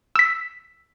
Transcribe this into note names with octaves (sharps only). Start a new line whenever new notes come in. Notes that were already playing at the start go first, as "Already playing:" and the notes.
E6 B6